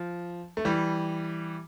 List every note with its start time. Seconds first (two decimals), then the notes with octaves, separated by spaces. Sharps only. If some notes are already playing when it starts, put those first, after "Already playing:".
Already playing: F3
0.57 A3
0.65 E3 G3